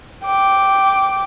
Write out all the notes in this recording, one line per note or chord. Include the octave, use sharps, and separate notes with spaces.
G5 D6